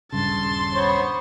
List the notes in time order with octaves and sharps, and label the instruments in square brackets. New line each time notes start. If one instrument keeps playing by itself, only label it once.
[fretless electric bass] D#1 G2 C#3 [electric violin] A5 C6
[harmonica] B3 C5 C#5